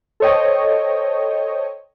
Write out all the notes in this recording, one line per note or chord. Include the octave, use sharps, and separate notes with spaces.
A4 C5 C#5 D#5 G5